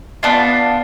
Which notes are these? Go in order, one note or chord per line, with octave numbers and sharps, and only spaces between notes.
B3 D4 F4